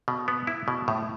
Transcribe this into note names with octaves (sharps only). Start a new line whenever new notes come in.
B2
B3
E4
B2
A2